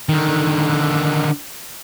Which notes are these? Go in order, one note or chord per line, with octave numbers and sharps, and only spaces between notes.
D3 D#3